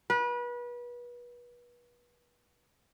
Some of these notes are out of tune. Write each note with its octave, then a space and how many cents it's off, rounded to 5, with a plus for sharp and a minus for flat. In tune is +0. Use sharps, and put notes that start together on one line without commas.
B4 -30